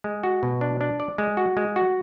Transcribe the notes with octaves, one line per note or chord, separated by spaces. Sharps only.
G#3
F#4
B2
D4
D4
D5
G#3
F#4
G#3
F#4